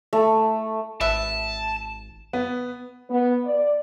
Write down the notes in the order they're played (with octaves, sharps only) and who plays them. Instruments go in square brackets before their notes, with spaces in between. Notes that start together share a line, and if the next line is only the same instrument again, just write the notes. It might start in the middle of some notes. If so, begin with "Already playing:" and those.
[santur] A3
[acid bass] G#1 [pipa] B4 E5 [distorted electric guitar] A5
[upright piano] B3
[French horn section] B3
D5